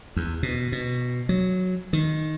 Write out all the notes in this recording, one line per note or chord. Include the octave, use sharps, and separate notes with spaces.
E2
B2
B2
F#3
D#3